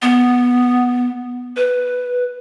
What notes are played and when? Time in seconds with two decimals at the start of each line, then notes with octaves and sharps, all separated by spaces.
0.02 B3
1.56 B4